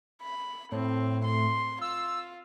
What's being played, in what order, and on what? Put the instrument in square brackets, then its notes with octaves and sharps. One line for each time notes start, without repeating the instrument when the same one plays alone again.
[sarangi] B5
[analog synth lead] A2 [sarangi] C4
[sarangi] C6
[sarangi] F4 [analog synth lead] E6